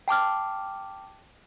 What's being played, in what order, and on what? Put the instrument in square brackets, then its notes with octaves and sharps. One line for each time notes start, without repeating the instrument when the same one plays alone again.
[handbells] G5 A5 D6 F6